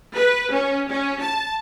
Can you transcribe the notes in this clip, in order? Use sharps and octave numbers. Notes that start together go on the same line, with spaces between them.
B4
C#4
C#4
A5